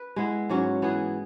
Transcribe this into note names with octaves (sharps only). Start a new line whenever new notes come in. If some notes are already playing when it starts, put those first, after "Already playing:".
Already playing: B4
G#3 B3 E4
G#2 F#3 C#4
E3 B3 G#4